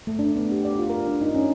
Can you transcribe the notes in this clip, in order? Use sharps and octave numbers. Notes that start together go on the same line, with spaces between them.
A3
D4
B3
G4
D5
F4
A#4
D4
D#4
C#4